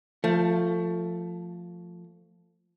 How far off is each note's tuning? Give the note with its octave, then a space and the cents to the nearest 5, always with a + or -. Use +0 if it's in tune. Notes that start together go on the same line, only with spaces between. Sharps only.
F3 +0 A3 +15